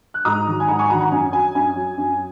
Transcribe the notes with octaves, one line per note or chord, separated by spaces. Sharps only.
F#6
G#2 A#5 D#6
D#3 F#3
G#5
G#2 F#5 A#5
G#5 C#6
D#3 F#3 F#5 A#5
F#5 A#5
F#2 G#5
F#3 G#5
F#2 G#5
F#3
F#2